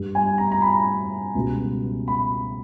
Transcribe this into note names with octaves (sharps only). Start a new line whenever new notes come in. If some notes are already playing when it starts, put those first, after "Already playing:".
Already playing: G2 G3
G#5
A#5
A#5
B5
C#2 B2 G3
B5